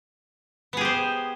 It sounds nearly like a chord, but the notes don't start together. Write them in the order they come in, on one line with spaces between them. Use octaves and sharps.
B3 G#4 G4 C5